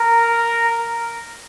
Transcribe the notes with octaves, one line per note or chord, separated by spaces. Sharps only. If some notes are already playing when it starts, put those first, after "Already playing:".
Already playing: A#4